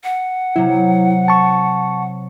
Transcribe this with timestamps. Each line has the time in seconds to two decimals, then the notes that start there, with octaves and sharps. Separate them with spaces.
0.04 F#5
0.56 C3 F#3 E4
1.28 A5 C#6